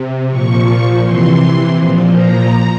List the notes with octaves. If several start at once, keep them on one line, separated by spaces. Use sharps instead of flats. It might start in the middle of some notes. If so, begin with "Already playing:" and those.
Already playing: C3
A#2 F3 C#6
C3 E3 C6
A#2 F3
A#5